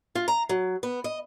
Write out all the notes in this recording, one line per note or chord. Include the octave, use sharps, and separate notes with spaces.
F4
A#5
F#3
B3
D#5